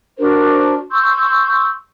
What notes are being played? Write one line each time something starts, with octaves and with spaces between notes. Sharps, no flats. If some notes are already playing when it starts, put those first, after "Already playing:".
D4 F#4 A#4 C5
C6 C#6 E6 G6